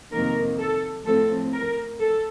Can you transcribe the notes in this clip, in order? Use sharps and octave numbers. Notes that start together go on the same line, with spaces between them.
F2 C3 D#3 A#3 A#4
A4
A2 F3 C4 A4
A#4
A4